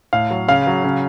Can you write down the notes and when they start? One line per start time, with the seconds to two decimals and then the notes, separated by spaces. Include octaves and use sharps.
0.13 A2 F5
0.31 F#3
0.48 C#3 F5
0.67 F#3
0.84 C#3